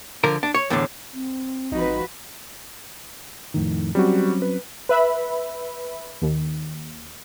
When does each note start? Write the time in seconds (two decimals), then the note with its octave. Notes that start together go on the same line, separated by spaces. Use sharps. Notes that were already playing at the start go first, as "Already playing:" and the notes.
0.24 D3 F3 A#4
0.43 D4
0.54 C#5
0.70 E2 A2 D3
1.13 C4
1.72 A1 F3 D#4 F#4 B4
3.54 F2 A2 D#3
3.95 F#3 G3 C4 C#4 F#4
4.42 B4
4.89 B4 E5 B5
6.22 D#2